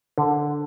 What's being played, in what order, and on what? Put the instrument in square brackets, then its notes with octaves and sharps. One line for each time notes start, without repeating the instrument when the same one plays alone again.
[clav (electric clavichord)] D3